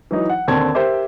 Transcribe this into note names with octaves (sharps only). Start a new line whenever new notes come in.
E3 F#3 D#4
F#5
D#2 D3 C4 A5 G#6
G4 A#4 C5 E5 D6